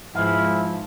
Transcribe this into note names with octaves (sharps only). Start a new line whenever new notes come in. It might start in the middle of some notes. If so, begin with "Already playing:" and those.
G#2 D#3 F3 B3 E4 G#4 F5